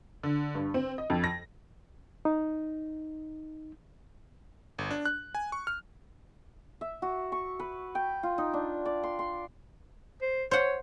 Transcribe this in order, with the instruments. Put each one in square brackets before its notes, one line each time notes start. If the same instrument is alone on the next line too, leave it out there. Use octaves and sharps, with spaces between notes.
[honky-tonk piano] D3
G2
C4
D#5
F2
A#6
[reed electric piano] D#4
[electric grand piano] G1
D4
F#6
G#5
C#6
F6
[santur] E5
F#4
C#6
B4
G5
F4
D#4
D4
D5
C6
C6
[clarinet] C5
[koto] C5 F#5 [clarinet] C#5